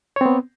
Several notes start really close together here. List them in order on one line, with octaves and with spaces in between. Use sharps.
C#5 C4 B3